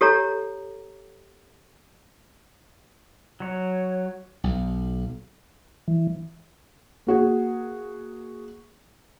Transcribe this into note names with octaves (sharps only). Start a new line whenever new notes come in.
G4 A4 C#5 A#5
F#3 C#5
B1
E3
A#3 F#4 G#4